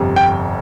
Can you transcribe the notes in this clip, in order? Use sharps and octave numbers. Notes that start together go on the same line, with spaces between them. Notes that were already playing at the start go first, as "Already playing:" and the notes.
Already playing: G1 F2 C3
G5